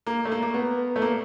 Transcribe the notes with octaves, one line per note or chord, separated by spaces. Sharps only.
A#3
A3
A#3
A#3
B3
A3
A#3